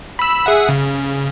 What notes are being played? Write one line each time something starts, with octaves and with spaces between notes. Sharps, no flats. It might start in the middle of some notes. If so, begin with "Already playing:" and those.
B5 E6
G#4 E5 F#5
C#3